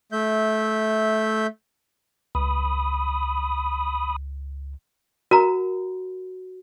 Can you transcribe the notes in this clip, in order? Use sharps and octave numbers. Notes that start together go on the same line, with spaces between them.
A3 E5 G6
C#2 B5 D#6
F#4 A#4 A#5